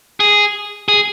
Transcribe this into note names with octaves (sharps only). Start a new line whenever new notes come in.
G#4
G#4